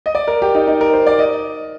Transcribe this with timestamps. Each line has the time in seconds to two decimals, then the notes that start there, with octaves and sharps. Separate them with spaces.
0.06 D#5
0.15 D5
0.28 A#4
0.42 G4
0.55 D#4
0.67 D#4
0.81 A#4
0.93 C5
1.07 D5
1.19 D#5